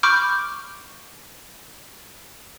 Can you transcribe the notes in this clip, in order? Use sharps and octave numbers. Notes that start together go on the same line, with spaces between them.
B5 C#6 D6 F6 G6 D7